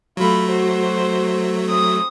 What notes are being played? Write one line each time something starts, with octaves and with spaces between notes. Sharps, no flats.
F#3 A3 F4 B5
F#4 C5
C4 D#6